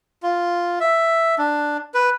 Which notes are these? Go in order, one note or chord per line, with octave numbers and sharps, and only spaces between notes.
F4
E5
D4
B4